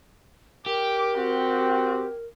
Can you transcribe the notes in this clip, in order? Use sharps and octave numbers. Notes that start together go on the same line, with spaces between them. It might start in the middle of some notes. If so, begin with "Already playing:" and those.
G4 A#4 D6
C4 F#4